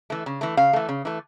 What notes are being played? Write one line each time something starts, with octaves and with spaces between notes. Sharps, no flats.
E3 A3
C#3
E3 A3
C#3 F5
E3 A3
C#3
E3 A3